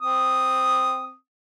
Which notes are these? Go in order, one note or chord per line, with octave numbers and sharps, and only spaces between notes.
C4 D#6